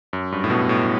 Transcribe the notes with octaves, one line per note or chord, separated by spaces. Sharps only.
F#2
G2
A2
B2
A2